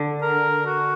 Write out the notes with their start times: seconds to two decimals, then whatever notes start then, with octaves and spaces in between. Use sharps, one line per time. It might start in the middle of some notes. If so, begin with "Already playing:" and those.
Already playing: D3
0.22 A#4
0.66 F#4